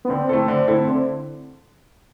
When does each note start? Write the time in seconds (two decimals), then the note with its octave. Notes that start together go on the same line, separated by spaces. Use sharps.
0.05 B3
0.09 D3 C4
0.29 A3 E4 A4
0.48 D3
0.68 A3 E4 A4
0.88 D3